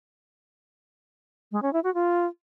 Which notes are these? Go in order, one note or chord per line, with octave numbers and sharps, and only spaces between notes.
G#3
C#4
E4
F#4
F4